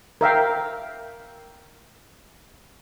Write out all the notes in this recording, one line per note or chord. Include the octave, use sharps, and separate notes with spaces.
A#4 E5 F5 G5